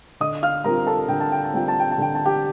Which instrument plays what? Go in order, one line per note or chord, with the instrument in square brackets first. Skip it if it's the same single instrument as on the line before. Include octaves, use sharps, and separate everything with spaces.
[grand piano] D3 D#5 D#6
F5 F6
G3 C4 F4 A#4 A#5
A4 A5
D3 G5
A5
G5
A5
G3 C4 F4 G5
A5
G5
A5
D3 G5
A5
G4 G5